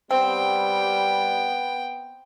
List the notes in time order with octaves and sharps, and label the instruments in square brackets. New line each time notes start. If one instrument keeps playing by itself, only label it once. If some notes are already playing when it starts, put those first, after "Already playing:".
[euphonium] G3 [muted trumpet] B3 [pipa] C4 [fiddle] G5